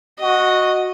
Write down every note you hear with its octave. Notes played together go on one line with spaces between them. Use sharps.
F#4 D#5